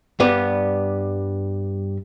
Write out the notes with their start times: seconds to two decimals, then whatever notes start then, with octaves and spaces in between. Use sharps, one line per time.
0.20 G2 G3 B3